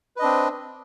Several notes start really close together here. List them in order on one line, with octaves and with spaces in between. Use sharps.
B4 D#5 D4 C4